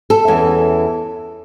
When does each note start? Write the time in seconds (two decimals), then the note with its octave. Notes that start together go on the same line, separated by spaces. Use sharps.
0.10 A4
0.28 E2 E3 C#4